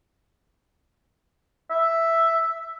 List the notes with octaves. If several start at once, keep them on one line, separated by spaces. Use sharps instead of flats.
E5